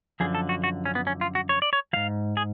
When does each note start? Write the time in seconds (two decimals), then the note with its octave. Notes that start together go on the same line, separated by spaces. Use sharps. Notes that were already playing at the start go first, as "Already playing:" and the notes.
0.20 F#2 D3 F3 G#4
0.35 A4
0.49 F#4
0.64 F#4
0.85 C#4
0.95 B3
1.07 C#4
1.21 F4
1.35 F#4
1.49 C#5
1.62 D5
1.73 C#5
1.93 G#2 F3 F5
2.37 G#4